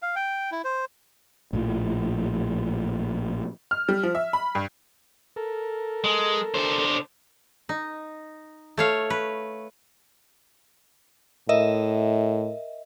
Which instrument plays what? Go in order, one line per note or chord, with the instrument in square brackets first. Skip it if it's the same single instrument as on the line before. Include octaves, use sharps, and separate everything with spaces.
[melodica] F5
G5
E4
C5
[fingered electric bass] A#1 A2 C#3 F3
[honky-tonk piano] F6
G3
F3
E5
B5
G2
[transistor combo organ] A4 A#4
[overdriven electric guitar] G#3
D3 C5
[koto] D#4
A3 C#5 F5
B4
[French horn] A2 [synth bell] A#4 D#5 E5